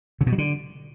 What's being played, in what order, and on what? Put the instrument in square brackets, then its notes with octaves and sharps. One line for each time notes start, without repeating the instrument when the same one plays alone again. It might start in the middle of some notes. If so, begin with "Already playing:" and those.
[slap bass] C#3
B2
F#3
D3